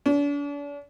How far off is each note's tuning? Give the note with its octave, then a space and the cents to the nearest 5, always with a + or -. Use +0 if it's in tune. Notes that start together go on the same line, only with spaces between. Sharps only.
D4 -40